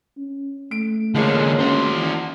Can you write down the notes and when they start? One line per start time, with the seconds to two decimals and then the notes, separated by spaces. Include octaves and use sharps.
0.17 C#4
0.71 A3 D7
1.15 D3 F3 G#3 A#3 C#4
1.59 C#4 F#4 C5
1.93 E3